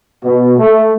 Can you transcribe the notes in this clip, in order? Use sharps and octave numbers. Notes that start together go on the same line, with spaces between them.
B2
A3